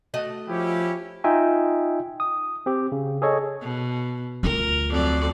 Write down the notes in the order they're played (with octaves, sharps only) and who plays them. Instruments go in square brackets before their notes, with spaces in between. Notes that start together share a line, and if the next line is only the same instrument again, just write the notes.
[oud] A3 F#4 D#5
[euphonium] F3 [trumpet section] C#4 E4 G4
[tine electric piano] D#4 F4 D#5 E5 G5 G#5
D#6
C4 G4
C#3
G#4 A4 C#5 D#5
[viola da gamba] B2
[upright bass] D2 F4 [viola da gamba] A#4
[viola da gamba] F2 F#3 D5